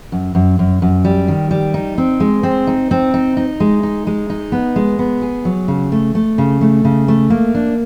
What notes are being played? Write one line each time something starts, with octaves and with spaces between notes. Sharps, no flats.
F#2
F#2
F#2
F#2
G3
D#3
G3
D#4
C4
G#3
C4
D#4
C4
D#4
D#4
G#3
D#4
G#3
D#4
B3
G#3
B3
G#4
F#3
C#3
A3
A3
C#3
A3
C#3
A3
A#3
D4